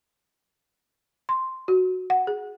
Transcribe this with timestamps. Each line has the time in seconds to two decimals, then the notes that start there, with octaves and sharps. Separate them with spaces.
1.29 C6
1.68 F#4
2.10 F#5
2.27 G#4